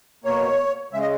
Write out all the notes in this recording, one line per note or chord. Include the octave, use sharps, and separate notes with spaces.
B2 A#3 C#5
C#3 G#3 E5
D#5